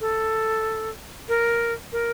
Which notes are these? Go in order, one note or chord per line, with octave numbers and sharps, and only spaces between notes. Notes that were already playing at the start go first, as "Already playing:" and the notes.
A4
A#4
A#4